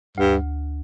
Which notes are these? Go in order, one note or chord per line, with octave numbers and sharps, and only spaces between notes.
D2 G2